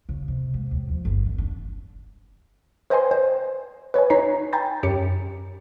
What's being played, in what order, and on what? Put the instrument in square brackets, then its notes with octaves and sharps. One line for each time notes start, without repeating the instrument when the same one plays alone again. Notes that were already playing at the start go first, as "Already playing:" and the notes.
[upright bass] C#3
C3
G#2
D#2
F3
G1
D#3
D4
[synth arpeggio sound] B4 C5 D#5 G5 G#5 C6
C5
B4 C#5 D#5 G#5
D#4 C#5 A#5 B6 C7
G5 G#5 A#5 B5 G6 A6
F#2 G4 C#5 C#7